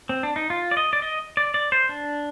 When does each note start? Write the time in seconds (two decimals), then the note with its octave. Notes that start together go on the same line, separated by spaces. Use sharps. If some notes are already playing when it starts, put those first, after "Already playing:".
0.09 C4
0.23 D4
0.36 D#4
0.50 F4
0.71 D5
0.77 D#5
0.93 D5
1.02 D#5
1.37 D5
1.54 D5
1.72 C5
1.89 D4